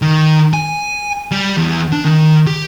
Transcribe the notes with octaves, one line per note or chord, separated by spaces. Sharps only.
D#3
G#5
G3
E2
D4
D#3
G4